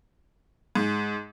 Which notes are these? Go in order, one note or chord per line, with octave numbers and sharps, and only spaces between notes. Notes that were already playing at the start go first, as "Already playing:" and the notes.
G#2